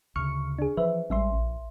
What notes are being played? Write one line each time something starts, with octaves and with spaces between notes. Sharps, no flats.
D2 C#3 C#6 F6 C#7
D4 G#4
E3 F3 B4 C5 E5
A1 G3 G#3 C#4 E5 C6
A#1